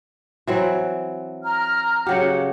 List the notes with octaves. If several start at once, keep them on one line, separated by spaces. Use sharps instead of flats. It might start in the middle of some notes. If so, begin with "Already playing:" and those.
E3 F#3 C4
A#5 F6
C#3 F#3 G4 F#5